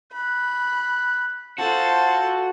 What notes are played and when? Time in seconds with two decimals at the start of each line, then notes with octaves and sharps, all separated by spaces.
0.12 B5 F#6
1.59 F4 F#4 A4 C5 A5